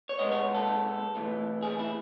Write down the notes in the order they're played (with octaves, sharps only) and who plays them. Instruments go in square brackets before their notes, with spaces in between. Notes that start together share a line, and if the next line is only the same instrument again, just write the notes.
[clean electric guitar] C#5
B1 A2 G#3 B3 D#5
C#5
A4
B1 A2 E3
G#4
E4